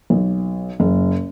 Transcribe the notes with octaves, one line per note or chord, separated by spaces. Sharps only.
B1
F#1